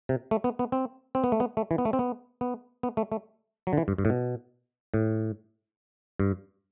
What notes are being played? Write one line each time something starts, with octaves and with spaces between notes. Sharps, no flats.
C3
A3
B3
B3
C4
C4
B3
A3
B3
A3
E3
B3
A3
C4
B3
B3
B3
A3
A3
F#3
D3
E3
G2
G2
A2
B2
A2
G2